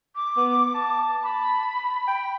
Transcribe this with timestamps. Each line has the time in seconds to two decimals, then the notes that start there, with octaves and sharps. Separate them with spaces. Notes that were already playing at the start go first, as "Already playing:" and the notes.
0.16 D6
0.37 B3
0.75 A5
1.23 B5
2.08 G5